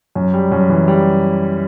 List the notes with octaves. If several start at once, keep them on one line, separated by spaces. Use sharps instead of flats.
F#2
G3
F#2
E3
G3